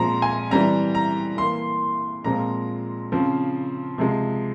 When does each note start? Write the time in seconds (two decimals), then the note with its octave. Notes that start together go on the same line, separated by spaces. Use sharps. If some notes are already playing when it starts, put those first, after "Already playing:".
Already playing: A#2 F3 G#3 C4 A#5 C6
0.22 G#5
0.51 E3 G3 C4 A#5
0.95 A#5
1.37 E3 A#3 C6
2.24 A#2 F3 G#3 C4 A#5
3.12 C#3 F3 C4
3.98 C3 F3 G#3